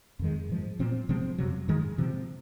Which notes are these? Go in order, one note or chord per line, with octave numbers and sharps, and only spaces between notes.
F2 D#3 G#3
G#2 F3 G#3
A#2 F3 C4
C3 F3 G#3 C4
F2 C3 F#3
G#2 D#3 G#3
C3 F3 C4